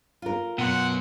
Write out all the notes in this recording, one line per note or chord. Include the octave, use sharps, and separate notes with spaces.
F4 A#4
F#2 B2 B3 F#5 C6